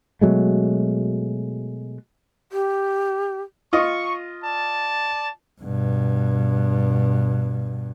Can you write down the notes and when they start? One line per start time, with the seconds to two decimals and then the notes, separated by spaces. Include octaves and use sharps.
0.21 B2 F#3 G#3 A3
2.52 G4
3.73 F4 D#5 C#6
4.42 D5 A5
5.61 G2 B2